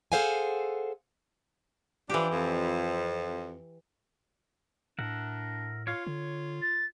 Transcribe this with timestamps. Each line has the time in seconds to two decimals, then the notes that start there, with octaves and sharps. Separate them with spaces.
0.12 G#4 A4 C5 F5 F#5 G#5
2.10 E3 F3 D4 G4
2.30 F2
4.99 A2 D4 A#4 E5 F#5
5.87 F4 C#5 F5
6.07 D3 C#5
6.62 A6